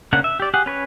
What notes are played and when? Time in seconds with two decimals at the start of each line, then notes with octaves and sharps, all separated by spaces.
0.13 C#3 A#3 D4 F#5
0.24 E5
0.40 G4 D5
0.54 G4 G#4 F#5
0.66 C#4 B4 C#5